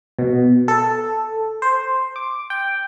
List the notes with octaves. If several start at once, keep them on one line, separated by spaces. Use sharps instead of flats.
B2
A4
C5
D6
G5